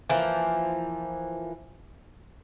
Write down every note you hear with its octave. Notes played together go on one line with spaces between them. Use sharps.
E3 F3 A#3